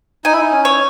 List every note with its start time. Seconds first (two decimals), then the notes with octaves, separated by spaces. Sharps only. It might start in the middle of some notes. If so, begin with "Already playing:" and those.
0.25 D#4 G#5
0.33 E4
0.42 D#4
0.51 C#4
0.65 C#5